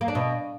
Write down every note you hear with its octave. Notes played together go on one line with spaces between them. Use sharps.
A#3
D4
B2